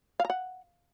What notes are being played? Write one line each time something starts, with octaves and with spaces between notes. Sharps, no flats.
F5
A#5
F#5